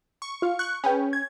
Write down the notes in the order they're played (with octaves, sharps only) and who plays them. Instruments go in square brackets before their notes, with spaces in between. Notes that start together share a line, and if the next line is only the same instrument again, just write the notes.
[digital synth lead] C#6
[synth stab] F4 F5
[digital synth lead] C#6 [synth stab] F#6
[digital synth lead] C#4 [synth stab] G#4 B4 G5
[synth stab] G#6